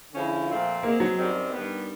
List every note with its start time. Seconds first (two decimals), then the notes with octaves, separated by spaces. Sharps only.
0.11 D3 F3 G#3 C#4 E4
0.47 A#2 F3 A3 C4 F4
0.82 B2 G#3 A#3 C4
1.00 F#3
1.18 F#2 D#3 G3 C4
1.53 G2 D#3 G3 B3